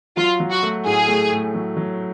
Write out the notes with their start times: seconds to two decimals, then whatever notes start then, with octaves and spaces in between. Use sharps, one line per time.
0.17 F#3 F4
0.40 F#3
0.51 F#4
0.63 A3
0.86 A2 G#4
1.08 A3
1.32 A2
1.55 F#3
1.77 F#3